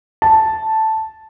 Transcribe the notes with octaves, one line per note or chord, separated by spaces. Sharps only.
A5